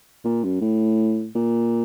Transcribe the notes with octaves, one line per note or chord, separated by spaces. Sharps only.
A#2
F#2
A2
A#2